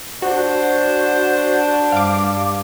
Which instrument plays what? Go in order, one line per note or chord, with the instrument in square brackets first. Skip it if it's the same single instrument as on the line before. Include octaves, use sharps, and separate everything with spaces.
[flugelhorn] D4 [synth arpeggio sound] F#4 [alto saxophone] C5
[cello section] G2 [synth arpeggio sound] F5 D6